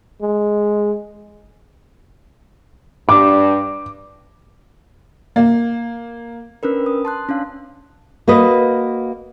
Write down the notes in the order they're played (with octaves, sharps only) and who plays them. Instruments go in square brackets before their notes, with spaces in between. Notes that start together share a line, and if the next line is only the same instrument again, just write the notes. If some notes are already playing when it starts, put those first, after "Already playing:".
[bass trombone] G#3
[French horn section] G2 [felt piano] D6
[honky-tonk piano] A#3
[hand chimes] C#4 D4 A#4 B4
D#6
A5 C6 F#6
C#4 D4 F5
[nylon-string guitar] A#3 F#4 B4 D#5